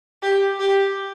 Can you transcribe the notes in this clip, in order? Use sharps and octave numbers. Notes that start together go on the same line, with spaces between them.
G4
G4